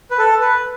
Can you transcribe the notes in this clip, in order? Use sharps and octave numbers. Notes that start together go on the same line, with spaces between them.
B4
A4
B4